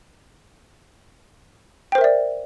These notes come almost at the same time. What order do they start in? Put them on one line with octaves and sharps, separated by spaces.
G5 C5 A#4 E5 D5